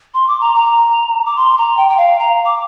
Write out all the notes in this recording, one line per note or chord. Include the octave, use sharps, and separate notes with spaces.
C6
D6
A#5
A#5
D6
C6
A#5
G5
G5
F5
A#5
D6